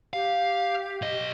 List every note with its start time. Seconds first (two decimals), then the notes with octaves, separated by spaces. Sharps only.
0.13 G4 F5
1.02 B1 D#5